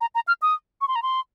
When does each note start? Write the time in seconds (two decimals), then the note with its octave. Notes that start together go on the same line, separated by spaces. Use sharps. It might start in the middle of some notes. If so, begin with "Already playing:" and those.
0.01 A#5
0.15 A#5
0.27 F6
0.42 D#6
0.81 C#6
0.88 C6
0.95 A#5
1.03 C6